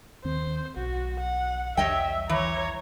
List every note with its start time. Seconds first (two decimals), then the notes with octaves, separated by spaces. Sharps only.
0.24 D#2 D#3 C4 C5
0.77 B1 F#4
1.20 F#5
1.77 B1 E2 G3 C#5 D#5 E5 G5
2.29 E3 C#5 A#5